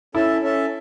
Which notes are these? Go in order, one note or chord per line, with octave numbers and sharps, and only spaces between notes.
C#4 E4 A4 E5 A5
C#4 A4 E5 A5